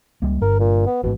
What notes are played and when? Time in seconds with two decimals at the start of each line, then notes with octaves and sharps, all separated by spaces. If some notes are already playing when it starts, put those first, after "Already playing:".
0.22 C#2 G3 A#3
0.42 G1 G2 A#4
0.60 A#2
0.86 B3
1.03 A1 G#2 B2